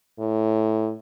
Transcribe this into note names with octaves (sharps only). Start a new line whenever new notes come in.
A2